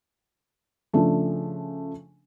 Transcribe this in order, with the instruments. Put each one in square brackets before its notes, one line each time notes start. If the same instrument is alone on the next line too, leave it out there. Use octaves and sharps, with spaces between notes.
[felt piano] C#3 F3 A3 D4